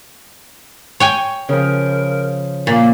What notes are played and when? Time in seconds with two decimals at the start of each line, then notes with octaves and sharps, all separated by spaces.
1.00 C#5 G5 G#5
1.49 C#3 F3 A#4
2.67 A#2 A#3